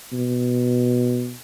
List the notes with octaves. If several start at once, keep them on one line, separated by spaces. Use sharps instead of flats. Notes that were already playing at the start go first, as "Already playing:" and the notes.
B2